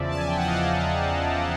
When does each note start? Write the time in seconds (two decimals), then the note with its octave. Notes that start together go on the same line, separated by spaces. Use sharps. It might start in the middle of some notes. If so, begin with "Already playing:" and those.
Already playing: E2 C#3 F3 D5 E5
0.08 A5
0.17 G#5
0.28 G5
0.37 F#5
0.47 D#5 F5
0.76 G#5 A#5